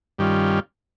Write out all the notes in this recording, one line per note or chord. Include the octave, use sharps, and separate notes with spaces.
G2 D#3 G3 C#4 F4